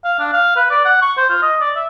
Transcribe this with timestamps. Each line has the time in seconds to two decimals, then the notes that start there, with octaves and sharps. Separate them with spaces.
0.04 F5
0.19 D4
0.33 F5
0.56 B4
0.70 D5
0.85 F#5
1.02 C#6
1.17 C5
1.30 F4
1.42 D#5
1.61 D5
1.76 E5